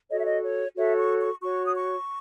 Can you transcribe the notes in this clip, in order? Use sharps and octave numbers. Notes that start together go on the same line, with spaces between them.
F#4 A4 C#5 D#5
E5
D#5
C#5
F#4 A4 C#5 E5
C#6
C#6
F#4 C#5 C#6
D#6
C#6